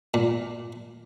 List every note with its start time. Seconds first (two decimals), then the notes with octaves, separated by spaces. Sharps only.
0.14 A#2